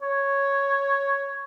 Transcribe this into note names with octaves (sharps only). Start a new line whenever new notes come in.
C#5